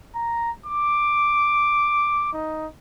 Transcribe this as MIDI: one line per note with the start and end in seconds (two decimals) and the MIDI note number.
0.15 0.51 82
0.66 2.32 86
2.33 2.66 63